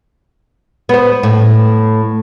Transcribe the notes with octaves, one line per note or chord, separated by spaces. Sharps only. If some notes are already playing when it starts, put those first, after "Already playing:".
B3 C5
A2